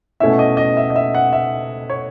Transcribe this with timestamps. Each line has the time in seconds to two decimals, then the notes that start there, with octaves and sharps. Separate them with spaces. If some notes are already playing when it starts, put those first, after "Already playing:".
0.20 B2 A3 C#4 E4 E5
0.39 D#5
0.57 D#5
0.77 E5
0.90 D#5
0.96 E5
1.15 F#5
1.33 E5
1.90 C#5